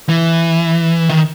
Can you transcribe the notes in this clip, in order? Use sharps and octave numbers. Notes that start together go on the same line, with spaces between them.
E3
D#3